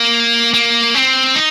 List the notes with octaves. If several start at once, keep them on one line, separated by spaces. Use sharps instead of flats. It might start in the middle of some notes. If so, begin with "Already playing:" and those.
Already playing: A#3
A#3
C4
D#4